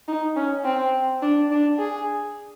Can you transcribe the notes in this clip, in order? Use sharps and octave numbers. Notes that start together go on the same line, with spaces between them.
D#4
C#4
C4
D4
D4
G#4